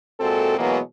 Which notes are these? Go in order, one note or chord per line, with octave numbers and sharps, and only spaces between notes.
A#2 G#3 C4 F#4 A4
B2 E3 F#3 G#3 A#3 B3